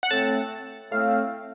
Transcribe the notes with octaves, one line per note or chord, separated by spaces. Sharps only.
F#5
A2 A3 C4 A5
A2 A3 C4 F5